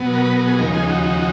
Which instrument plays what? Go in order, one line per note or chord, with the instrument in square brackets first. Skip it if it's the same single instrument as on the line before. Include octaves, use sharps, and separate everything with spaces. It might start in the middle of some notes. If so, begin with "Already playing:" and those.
Already playing: [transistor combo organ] B2 F#3 B3
A#4
B4
A#4
G#4
D#2 C#3 F3 G#3 D#4 A#4
G#4
F#4
F#4